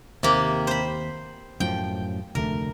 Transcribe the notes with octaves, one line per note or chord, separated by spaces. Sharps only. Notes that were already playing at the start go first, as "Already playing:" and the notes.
D#2 C3 A#3
C5 B5
F#2 A2 F3 G5
F1 D2 A3 A#4